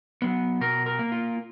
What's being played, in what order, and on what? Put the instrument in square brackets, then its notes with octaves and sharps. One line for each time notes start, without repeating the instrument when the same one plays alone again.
[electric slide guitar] F#3 B3
B2 A#4
A#4
A#3
F4